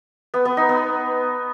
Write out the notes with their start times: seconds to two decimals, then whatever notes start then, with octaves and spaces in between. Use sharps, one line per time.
0.34 B3
0.45 B3
0.57 D#4
0.69 B3